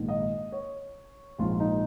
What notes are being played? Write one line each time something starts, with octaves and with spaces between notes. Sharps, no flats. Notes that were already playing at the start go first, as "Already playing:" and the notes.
Already playing: A#1 G#2 D#3
D#5
C#5
A#1 G#2 F3 F4
D#4